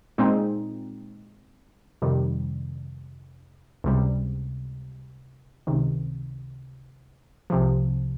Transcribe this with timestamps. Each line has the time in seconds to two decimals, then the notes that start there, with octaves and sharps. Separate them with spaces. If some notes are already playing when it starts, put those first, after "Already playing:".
0.18 A#2 G#3 C4 D#4
2.02 F2 C3 D#3 G3
3.84 C#2 C3 G3
5.67 C#2 C3 D#3
7.50 C2 C3 F3